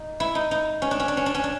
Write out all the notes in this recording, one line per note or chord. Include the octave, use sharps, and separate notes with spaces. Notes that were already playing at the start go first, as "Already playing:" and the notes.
Already playing: D#4
E4
D#4
D#4
C#4
D4
C#4
D4
C#4
D4
C#4
D4